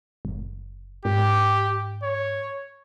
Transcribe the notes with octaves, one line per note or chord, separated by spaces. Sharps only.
F#1
G#2 G4
C#5